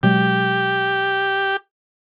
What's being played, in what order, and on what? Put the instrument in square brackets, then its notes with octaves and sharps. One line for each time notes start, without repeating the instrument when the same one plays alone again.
[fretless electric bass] B2 F#3 G#3 [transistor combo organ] G4